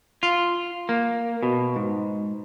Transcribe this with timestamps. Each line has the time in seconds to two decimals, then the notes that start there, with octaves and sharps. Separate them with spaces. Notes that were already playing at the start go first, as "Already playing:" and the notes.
0.23 F4
0.89 A#3
1.43 B2
1.76 G#2